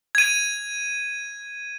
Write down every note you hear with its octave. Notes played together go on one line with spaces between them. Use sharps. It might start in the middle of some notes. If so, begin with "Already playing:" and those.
G#6 D#7